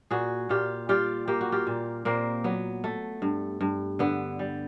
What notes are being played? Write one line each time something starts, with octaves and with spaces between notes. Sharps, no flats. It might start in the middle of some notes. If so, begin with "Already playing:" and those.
A#2 F#4 G#4
A#2 F4 G4
G3 F4 G4
A#3 G4
F#4
F4 G4
A#2
A#2 A#3 C4
F#3 B3
A3
G2
G2
D3 B3
G3